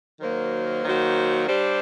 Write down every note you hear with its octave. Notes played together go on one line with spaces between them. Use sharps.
D#3 F#3 A#3 F#4 C5
D#3 F#3 A#3 F#4 C5
G3 D4 G4 C5